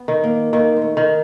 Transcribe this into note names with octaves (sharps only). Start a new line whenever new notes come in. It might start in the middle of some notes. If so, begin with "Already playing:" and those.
Already playing: B3
D#3
A#3
D#3 A#3
G#3
A3
D#3